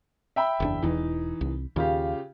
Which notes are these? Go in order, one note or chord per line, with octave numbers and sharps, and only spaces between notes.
E5 G5 B5
F#1 E2 D4
E1 E2 E3 D#4
C2
D#2 C#3 F4 G4